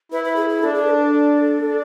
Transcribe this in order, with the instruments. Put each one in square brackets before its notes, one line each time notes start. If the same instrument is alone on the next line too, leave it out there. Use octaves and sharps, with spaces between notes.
[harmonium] E4 [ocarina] B4
[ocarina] B4
G#4
G#4
[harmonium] D4 [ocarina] A4
[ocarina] G#4
B4
A4
[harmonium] D4